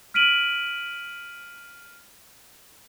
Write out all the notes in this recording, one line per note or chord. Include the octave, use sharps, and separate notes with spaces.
F6 B6 D7 D#7 F#7